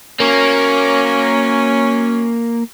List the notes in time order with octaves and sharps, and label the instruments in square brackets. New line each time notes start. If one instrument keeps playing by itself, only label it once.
[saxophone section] F#3 C#4 [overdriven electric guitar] A#3